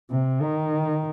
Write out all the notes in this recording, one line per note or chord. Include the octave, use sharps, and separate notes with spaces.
C3
D#3